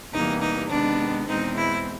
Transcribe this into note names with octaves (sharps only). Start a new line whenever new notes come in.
E2 C3 E3 G3 A#3 D#4
D#4
C3 D#3 G#3 B3 D4
E2 B2 G#3 C4 D#4
E4